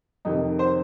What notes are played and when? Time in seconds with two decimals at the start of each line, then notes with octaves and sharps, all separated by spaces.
0.25 F2 C3 D#3 D#4
0.59 C5